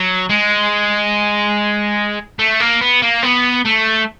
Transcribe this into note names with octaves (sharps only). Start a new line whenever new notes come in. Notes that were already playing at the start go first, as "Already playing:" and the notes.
Already playing: F#3
G#3
A3
A#3
B3
A#3
B3
A3